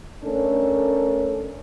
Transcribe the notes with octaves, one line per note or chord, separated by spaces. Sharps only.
A3 C#4 D4 A4 A#4